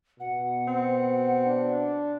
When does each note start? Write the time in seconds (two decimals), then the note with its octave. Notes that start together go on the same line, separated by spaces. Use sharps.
0.20 B2 F#5
0.68 C4
1.47 D4